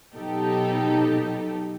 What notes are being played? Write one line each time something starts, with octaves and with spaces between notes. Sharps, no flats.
B2 F#3 D#4 G4 A4